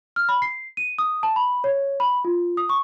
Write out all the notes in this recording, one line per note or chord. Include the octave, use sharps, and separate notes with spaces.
F6
B5
C7
D#7
D#6
A5
B5
C#5
B5
F4
D#6
C#6